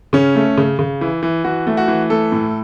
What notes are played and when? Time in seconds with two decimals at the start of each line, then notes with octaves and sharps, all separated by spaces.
0.13 C#3 C#4
0.36 A3
0.58 C#3
0.79 C#3
1.01 E3
1.23 E3
1.44 E3 F#4
1.67 A3
1.77 F#4
1.88 E3
2.10 A3 A4
2.32 A2